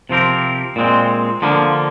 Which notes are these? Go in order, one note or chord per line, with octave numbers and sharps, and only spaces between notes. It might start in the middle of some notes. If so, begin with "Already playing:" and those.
C3 F3 C4 G4 A#4
A#2 G#3 C4
D3 F3 A#3